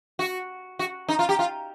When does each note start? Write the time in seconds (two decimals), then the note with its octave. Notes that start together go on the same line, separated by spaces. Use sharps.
0.19 F#4
0.79 F#4
1.09 D#4
1.19 F4
1.29 G4
1.39 F4